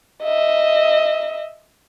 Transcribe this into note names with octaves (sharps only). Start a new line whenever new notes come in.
D#5 E5